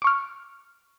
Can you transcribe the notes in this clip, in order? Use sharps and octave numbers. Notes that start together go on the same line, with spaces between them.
C#6 D6 F6